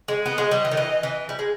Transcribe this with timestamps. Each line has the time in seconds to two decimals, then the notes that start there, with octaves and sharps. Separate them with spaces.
0.08 G#3
0.25 B3 D#5
0.38 G#3
0.51 G3
0.65 E3
0.71 D#3
0.77 E3
1.03 E3
1.29 G3
1.39 G#3